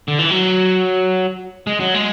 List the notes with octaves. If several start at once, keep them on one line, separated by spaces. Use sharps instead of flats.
D3
E3
F#3
G#3
F#3
G#3